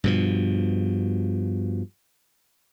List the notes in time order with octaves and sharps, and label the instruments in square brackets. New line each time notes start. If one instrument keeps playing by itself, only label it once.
[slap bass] G2 B2 F3